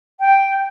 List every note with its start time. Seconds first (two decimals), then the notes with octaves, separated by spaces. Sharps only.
0.19 G5